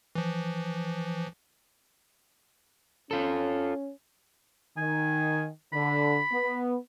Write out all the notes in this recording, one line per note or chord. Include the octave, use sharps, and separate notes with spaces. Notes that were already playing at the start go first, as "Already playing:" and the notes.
E3 F3
C#4 F4 A4
D#3 G#5
D3 B5
B3